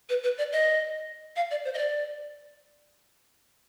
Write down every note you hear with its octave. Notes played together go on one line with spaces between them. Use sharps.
B4
B4
D5
D#5
F5
D5
C5
D#5
D5